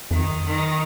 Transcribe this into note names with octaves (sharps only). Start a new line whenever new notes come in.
F2 D#3
D#3